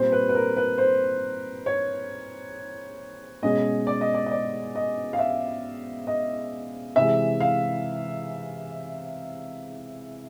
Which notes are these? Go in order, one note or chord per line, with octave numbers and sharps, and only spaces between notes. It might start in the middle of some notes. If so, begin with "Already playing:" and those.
Already playing: A#2 G3 C4 C5
B4
B4
A#4
B4
C5
C#5
B2 G#3 C#4 D#5
D5
D#5
D5
D#5
D5
D#5
F5
E5
D#5
C3 E3 G#3 E5
F5